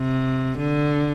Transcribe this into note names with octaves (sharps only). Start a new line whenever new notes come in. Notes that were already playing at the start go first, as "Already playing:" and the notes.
Already playing: C3
D3